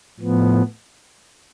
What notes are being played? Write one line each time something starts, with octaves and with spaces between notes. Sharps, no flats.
A2 F3 B3